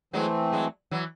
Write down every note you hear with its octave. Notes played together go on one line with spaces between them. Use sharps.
E3 F#3 G#3 A3 C4
F#3 G#3
E3 F#3